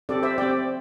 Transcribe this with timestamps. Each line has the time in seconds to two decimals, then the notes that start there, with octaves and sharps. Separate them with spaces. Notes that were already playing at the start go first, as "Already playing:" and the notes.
0.09 C4 G4 A4 D5
0.23 C5 E5
0.38 C4 G4 D5 G5